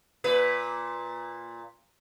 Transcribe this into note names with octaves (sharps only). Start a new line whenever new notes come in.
A#2 B4